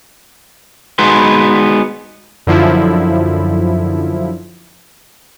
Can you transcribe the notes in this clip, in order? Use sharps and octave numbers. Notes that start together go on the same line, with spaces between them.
G#3 B3 D#4 F#4 B4 C6
F#2 D3 F3 E4